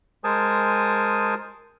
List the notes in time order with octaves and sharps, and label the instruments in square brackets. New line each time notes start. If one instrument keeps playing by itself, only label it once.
[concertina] G#3 A#4 C5 G#5 A5 D#6